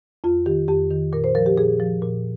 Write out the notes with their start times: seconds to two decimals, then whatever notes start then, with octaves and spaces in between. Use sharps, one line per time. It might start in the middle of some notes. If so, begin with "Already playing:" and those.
0.24 F2 F4
0.46 D#3 G4
0.68 F2 G4
0.91 D#3
1.13 A#2 A#4
1.24 C5
1.35 F3 A#4
1.46 G4
1.57 A#2 G#4
1.80 F3
2.02 A#2